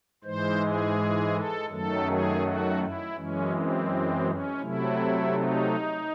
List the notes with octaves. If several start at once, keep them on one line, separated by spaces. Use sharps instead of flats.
G#2 E3 G#3 C5
G#4
A4
F#2 D#3 F#3 A3 A4
G#4
F#4
E4
F#2 E3 G#3 C#4
C4
C#4
C3 F#3 A3 E4
D#4